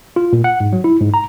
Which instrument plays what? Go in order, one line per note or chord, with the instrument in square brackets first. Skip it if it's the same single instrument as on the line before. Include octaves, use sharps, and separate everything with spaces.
[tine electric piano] F4
A#2
F#5
G#2
F#3
E4
G#2
A#5